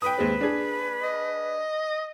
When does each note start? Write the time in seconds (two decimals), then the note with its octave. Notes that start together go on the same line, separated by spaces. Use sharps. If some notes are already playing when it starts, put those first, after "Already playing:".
0.02 B4 G5 D#6
0.18 D#2 G#3 C4
0.41 D4 G#4
1.03 D#5